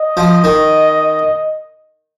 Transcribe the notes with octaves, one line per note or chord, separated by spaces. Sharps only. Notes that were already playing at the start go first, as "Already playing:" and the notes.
Already playing: D#5
F3
D#3